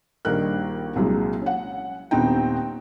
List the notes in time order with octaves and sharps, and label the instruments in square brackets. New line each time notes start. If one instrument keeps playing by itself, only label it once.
[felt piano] A#1 D#3 G3 A#4 F#6
C2 A#2 F#3 G#3
C#4 F#5
D#1 B3 C4 D#4 G5